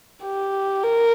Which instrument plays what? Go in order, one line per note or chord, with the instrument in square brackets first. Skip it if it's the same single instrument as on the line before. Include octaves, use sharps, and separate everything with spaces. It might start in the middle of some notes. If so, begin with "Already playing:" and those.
[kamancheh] G4
A#4